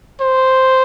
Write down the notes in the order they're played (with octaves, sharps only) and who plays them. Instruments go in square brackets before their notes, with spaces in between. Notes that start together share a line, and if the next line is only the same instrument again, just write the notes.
[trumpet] C5